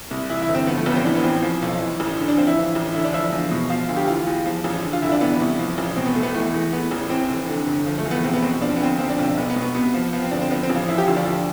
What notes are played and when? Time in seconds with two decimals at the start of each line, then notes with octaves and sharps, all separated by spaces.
0.11 C2
0.29 E3 E4
0.42 E4
0.48 G1
0.55 C4
0.67 F3 B3
0.77 A3
0.86 A1 B3
0.96 C4
1.05 E3 D4
1.15 B3
1.24 A1 C4
1.43 F3
1.62 B1
1.81 E3
2.00 A1
2.19 D3
2.28 D4
2.37 F3 C4
2.47 E4
2.56 E3
2.75 A1
2.94 D3 E4
3.04 D4
3.13 F3 E4
3.32 E2
3.51 B2
3.70 F3 F4
3.89 D2
3.96 G4
4.08 E3 F4
4.27 E2
4.46 F3
4.64 A1
4.83 D3
4.93 F4
5.02 F1 E4
5.12 D4
5.21 E3 B3
5.40 C2
5.59 F3
5.78 A1
5.96 B2 C4
6.06 B3
6.14 F1 A3
6.23 B3
6.34 E3 A3
6.54 E2
6.73 E3 B3
6.91 A1
7.10 E3 C4
7.29 F1
7.48 D3
7.67 G1
7.86 F3
7.98 A3
8.05 E2
8.11 B3
8.24 B1 C4
8.33 B3
8.43 B2 C4
8.61 F3 D4
8.69 C4
8.76 B3
8.81 D2 C4
8.99 F3 C4
9.10 D4
9.18 B1 C4
9.37 B1 B3
9.50 B3
9.56 B2
9.62 B3
9.75 C3 B3
9.94 F3
10.13 F3 B3
10.22 C4
10.31 G1 D4
10.41 C4
10.50 F3 B3
10.63 C4
10.70 A1
10.75 F4
10.88 F3 E4
10.98 G4
11.07 D2 F4
11.17 D4
11.26 F3